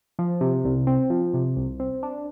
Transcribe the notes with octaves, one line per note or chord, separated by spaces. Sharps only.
F3
C3
C2
C4
F3
C3
C2
C4
D4